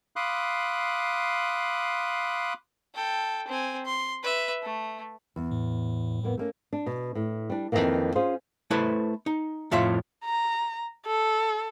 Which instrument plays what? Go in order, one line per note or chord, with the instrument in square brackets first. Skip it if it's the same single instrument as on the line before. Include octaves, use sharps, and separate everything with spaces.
[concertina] F5 B5 C6 D6 D#6 F#6
[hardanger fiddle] A4 G5
C4 G#5
C6
B4 E5
A3
[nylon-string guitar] E2
[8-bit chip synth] A2
[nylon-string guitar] F2 A#3 B3
A3 A#3 C#4
D4
B2
A2
G3 D4
F2 A2 D#3 E3 A#3
C#4 F4 G#4 C5
[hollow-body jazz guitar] A3 E4 A4 B4 C5
D#4
F2 A2 F4 E5 C6
[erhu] A#5
A4